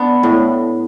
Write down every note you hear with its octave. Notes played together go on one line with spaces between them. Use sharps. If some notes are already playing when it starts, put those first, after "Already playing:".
Already playing: B3 D4
A2